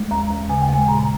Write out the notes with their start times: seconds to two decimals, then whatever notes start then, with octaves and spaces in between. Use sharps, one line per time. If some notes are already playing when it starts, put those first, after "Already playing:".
Already playing: G#3
0.11 D#2 A#5
0.30 D#2
0.49 C#3 G#5
0.62 G5
0.69 G#3 G#5
0.88 A#2 A#5